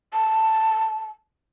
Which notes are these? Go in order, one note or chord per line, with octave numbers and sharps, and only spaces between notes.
A5